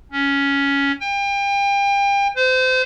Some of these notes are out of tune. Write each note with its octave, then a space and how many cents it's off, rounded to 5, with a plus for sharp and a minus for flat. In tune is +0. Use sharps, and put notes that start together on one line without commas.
C#4 +10
G5 +35
C5 -30